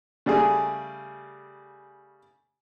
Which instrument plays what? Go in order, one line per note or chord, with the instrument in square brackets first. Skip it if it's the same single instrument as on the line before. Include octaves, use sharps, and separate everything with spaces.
[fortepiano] C#3 G3 A3 G#4